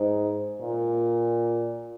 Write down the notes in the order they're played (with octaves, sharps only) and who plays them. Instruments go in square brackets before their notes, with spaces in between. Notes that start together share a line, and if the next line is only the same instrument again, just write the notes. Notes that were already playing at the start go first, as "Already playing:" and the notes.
Already playing: [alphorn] G#2
A#2